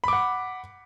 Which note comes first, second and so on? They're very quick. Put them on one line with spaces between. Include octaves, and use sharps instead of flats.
B5 D6 F#5